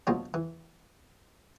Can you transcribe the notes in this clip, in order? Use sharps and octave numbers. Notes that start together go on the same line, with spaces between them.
D2 B2 F3 F4 C#5
E3